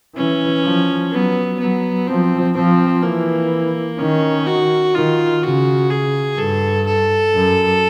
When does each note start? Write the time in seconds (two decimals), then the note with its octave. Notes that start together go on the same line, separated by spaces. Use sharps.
0.16 E3 C#4
0.63 F3
1.12 F#3 B3
1.60 F#3 B3
2.07 F3 C4
2.55 F3 C4
3.03 E3 A#3
3.99 D#3 C#4
4.47 F#4
4.95 D#3 F4
5.43 C#3 F#4
5.90 G#4
6.38 G2 A4
6.86 A4
7.35 F#2